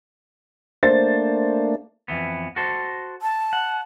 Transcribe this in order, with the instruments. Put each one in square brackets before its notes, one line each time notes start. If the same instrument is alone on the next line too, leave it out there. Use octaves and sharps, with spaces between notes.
[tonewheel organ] A3 A#3 D4 [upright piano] C5 A6
[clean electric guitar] F2 E3 B3
F#4 A4 C5
[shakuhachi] A5
[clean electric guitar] F#5